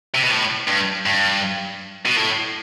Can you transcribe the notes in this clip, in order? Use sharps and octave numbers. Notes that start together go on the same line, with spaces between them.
C3
B2
A2
G2
G2
B2
A2